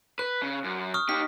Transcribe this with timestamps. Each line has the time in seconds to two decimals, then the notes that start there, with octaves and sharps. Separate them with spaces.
0.19 B4 F#6
0.42 C#3
0.64 F#2
0.94 C#6 D#6 F6
1.09 D#4 G4 B6